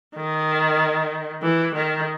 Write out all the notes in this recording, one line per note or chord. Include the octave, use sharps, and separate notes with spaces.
D#3
E3
D#3